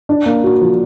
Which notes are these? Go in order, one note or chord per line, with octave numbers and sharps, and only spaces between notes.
D4
A#3
F#4
F3